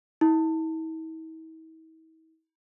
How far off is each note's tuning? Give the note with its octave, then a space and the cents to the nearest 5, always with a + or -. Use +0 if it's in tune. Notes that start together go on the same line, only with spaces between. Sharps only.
E4 -45